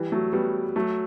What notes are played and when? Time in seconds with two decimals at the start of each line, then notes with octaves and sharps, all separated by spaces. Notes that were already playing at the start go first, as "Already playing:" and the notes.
Already playing: E3 G3
0.12 F#3 A3
0.33 G3 B3
0.76 F#3 A3